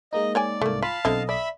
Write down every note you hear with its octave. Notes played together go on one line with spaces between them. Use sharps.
G#3 A#3 D#4 D#5
C#5 D5 G5 G#5
C2 G#2 A3 A#3
F4 F5 A5 B5
B1 D3 C4 E4 A4 D#5
D5 E5 B5